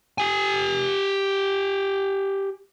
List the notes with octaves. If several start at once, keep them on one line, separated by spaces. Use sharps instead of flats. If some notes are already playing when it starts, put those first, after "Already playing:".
G4 G#5